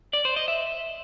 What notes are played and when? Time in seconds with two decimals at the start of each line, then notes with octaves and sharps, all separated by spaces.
0.13 D5
0.25 C5
0.36 D#5
0.48 E5